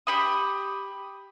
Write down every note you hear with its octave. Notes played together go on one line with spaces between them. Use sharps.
G4 B5 D#6